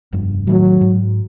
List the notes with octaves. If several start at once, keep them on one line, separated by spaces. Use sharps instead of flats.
F1 G2
A2 D#3 F#3 A3
G#2